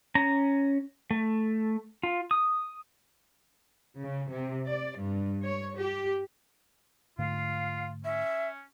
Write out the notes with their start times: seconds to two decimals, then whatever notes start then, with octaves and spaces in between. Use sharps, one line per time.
0.15 C#4 A#5
1.11 A3
2.03 F4
2.31 D#6
4.01 C#3
4.30 C3
4.70 D5
4.99 G2
5.45 C#5
5.78 G4
7.18 G#2 D3 A3 F4 F5
8.04 C#4 E5